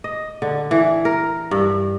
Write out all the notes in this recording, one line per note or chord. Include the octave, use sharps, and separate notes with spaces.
D#5
D3
E3
A#4
G2